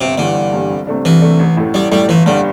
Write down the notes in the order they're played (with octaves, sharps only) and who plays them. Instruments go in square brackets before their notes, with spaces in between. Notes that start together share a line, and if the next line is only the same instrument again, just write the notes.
[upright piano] G1 [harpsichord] C3
[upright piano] G2 E3 G3 [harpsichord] D3
[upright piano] G1
G2 E3 G3
C2
C3 A3 D4
[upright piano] C2 [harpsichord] E3
[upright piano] C3 A3 D4
A1
A2 A3
[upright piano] A1 [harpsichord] G3
[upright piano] A2 A3 [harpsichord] G3
[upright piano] G1 [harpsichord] E3
[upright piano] G2 G3 D4 [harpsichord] D3